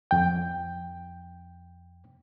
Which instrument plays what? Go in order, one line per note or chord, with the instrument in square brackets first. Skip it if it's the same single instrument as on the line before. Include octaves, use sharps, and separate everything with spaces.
[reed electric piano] F2 G5